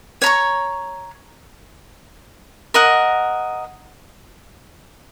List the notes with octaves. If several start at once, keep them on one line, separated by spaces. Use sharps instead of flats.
C#5 A#5 C#6
A#4 D#5 F#5